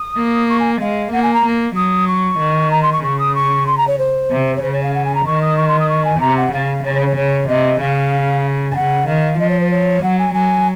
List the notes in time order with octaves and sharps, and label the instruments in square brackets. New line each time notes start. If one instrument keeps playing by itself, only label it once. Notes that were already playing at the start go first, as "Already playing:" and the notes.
Already playing: [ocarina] D#6
[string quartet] A#3
[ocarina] C#6
G#5
[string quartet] G#3 [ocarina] F5
[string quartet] A#3 [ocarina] F#5
[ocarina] G#5
A#5
[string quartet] A#3
[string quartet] F#3 [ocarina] D#6
[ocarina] C#6
[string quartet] D#3
[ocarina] A#5
C6
C#6
[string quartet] C#3 [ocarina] C#6
[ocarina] D#6
C#6
C6
A#5
C#5
C5
[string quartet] C3
[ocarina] C#5
[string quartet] C#3 [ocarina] C5
[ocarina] C#5
F5
F#5
G#5
A#5
[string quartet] D#3 [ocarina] C#6
[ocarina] D#6
C#6
C6
D#6
C#6
G#5
[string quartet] C3 [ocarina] A#5
[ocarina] F#5
[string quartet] C#3 [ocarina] F5
[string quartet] C#3 [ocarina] C#5
[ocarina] C#5
C#5
[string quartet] C#3 [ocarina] C#5
[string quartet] C3 [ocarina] D#5
[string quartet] C#3 [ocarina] F5
[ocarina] G#5
[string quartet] C#3 [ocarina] F#5
[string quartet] D#3 [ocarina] F5
[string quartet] F3 [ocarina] D#5
[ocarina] C#5
C5
C#5
[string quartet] F#3 [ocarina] F#5
[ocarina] G#5
[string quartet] F#3 [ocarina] G#5